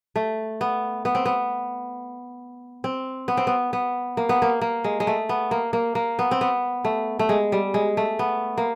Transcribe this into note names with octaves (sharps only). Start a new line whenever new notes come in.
A3
B3
B3
C4
B3
C4
B3
C4
B3
B3
A#3
B3
A#3
A#3
G#3
G#3
A3
B3
A#3
A#3
A#3
B3
C4
B3
A3
A3
G#3
G3
G#3
A3
B3
A#3